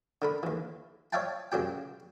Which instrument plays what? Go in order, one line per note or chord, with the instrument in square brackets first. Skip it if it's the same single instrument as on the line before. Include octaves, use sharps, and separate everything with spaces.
[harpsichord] D3 A#4 B5
D#2 E3
C#5 D5 E5 F5 G5 A5
C#2 F#2 F#3 G4 G5